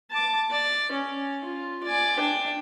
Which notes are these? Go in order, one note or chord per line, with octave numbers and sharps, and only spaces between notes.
A5 D6
D5
C#4
F4
D5 G#5
D4 G5